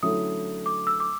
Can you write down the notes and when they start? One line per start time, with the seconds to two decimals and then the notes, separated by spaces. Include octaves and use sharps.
0.03 D3 F#3 A3 C#4 E4 D#6
0.66 D6
0.87 E6
1.00 D6